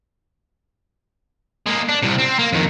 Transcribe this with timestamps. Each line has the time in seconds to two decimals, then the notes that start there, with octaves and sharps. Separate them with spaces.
1.67 G#3 A#3
1.89 D4
2.03 C2 C3
2.18 C4
2.39 A#3
2.53 F2 D#3